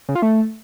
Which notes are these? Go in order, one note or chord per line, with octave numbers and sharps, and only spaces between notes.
C#3
F4
A3